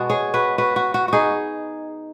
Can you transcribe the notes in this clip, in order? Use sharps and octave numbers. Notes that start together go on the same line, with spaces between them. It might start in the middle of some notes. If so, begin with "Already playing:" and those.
Already playing: B2 G#3 B3 F#4
G#4 C#5
F#4 B4
F#4 B4
F#4
F#4
D#4 F#4 G#4